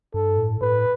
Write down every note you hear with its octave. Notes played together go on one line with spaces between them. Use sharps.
G2 A4
A2
A2 B4